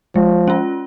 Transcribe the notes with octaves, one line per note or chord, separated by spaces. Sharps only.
F3 G#3
C#4 F4